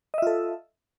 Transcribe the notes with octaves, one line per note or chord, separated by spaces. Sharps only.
F4 A4 D#5 E5